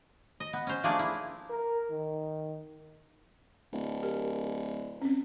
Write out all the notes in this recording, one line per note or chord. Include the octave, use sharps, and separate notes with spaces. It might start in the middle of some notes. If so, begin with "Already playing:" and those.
D#5
B3
C#4 C5
F3 A3 A#3 D4 G#4 D5
E4
A#4
D#3
D1
G4 A#4
C4 C#4